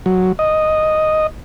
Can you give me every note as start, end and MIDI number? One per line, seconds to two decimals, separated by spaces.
0.06 0.32 54
0.39 1.27 75